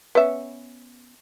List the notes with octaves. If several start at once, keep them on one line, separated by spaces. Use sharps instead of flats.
B3 C#4 E5